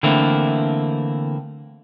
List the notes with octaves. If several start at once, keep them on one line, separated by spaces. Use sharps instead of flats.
D3 E3 A3 A#3 C4 E4